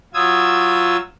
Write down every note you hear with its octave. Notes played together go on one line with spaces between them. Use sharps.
F#3 F4 D#6 E6 G#6